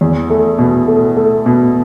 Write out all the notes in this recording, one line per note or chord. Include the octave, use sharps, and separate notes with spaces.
E2
A3
B2
A3
A3
B2